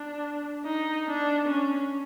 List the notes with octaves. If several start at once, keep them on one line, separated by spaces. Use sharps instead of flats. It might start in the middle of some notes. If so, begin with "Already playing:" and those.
Already playing: D4
D#4
D4
C#4